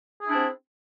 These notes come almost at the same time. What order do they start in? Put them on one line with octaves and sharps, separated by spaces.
G#4 E4 D4 C4